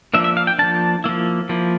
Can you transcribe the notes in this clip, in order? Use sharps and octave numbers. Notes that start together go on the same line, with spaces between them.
F3 A#3 D4 E5
E5
F5
G5
F3 A#3 D4 A5
F3 A#3 E4
F3 A#3 E4